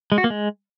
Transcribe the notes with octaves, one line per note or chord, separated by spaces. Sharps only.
G#3
F#4
A#3
G#3